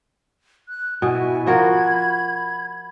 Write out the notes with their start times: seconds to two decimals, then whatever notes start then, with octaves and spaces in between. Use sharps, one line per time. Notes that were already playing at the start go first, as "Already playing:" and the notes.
0.68 F#6
1.02 B2 E4 F#4 G#5
1.47 F3 F#4 A#4 B5 G#6